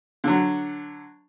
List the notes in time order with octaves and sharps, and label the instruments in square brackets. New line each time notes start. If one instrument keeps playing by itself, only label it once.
[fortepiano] D3 F#3